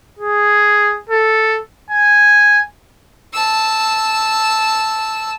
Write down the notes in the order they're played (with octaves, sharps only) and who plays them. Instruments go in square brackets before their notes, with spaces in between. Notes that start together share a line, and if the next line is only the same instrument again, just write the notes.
[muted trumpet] G#4
A4
G#5
[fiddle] A5 E6